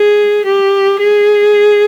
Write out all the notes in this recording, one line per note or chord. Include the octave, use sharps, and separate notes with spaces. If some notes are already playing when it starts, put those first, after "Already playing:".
Already playing: G#4
G4
G#4